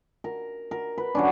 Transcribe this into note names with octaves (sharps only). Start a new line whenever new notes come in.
A#4
A#4
B4
F#3 C#4 D4